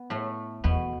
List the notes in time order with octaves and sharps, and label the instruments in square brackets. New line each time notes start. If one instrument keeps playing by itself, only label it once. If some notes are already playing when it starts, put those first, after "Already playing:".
Already playing: [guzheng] B3
A2 A3
[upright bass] E2 [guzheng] B2 B3